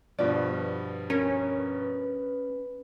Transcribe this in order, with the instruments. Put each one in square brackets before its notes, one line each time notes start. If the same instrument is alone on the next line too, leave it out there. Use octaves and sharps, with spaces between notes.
[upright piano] G2 B2 F3 [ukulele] D5
[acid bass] C#4 [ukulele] A#4
[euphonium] B4